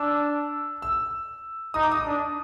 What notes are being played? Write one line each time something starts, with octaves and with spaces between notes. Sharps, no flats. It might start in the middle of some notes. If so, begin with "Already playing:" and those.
Already playing: D4 E6
E6
D#4 D#6
D6
D#6
D4